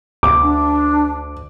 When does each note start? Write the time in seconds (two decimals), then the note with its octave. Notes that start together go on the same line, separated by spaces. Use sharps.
0.23 D2 D6
0.43 D4